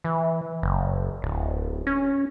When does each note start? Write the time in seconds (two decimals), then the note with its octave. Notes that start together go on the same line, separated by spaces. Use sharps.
0.04 E3
0.62 F#1
1.22 D1
1.87 C#4